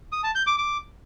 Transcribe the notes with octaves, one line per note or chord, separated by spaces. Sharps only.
D#6
A5
G6
D6
D6